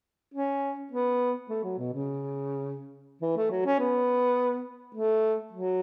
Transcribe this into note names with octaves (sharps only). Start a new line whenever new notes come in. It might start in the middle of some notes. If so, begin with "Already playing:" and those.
C#4
B3
A3
F#3
B2
C#3
E3
A3
F#3
C#4
B3
A3
F#3